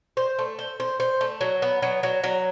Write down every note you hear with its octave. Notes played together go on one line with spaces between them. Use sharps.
C5
A3
C5
C5
C5
A3
F#3
B3
F#3
F#3
F#3